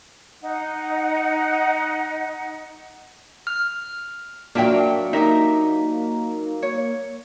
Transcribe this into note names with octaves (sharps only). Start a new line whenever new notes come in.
D#4 F#5
F6
F#3 A#3 D4 F4 E5 G5
D#4 G4 A#4 E5
C#5